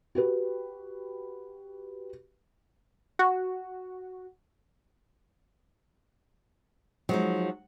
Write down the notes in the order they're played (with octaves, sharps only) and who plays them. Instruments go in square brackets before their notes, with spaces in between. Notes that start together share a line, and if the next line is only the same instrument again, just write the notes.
[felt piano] F#4 G4 B4
[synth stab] F#4
[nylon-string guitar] F3 G#3 D#4 [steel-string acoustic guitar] F#3